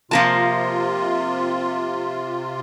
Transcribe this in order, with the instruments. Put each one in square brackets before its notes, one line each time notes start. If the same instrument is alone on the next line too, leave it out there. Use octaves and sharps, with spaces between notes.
[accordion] C3 F4 [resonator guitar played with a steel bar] F3 A#3 A5